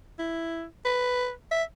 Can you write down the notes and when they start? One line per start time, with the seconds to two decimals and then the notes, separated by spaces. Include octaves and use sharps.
0.19 E4
0.85 B4
1.52 E5